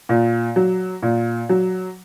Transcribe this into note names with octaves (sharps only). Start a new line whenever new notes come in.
A#2
F#3
A#2
F#3